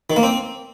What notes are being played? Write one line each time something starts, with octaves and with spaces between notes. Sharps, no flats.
D#3
A#3
C4